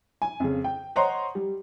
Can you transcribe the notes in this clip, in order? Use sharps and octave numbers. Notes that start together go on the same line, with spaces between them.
G#5
F2 C#3
G5
C5 C#5 D#5 F#5 A#5 C6
G3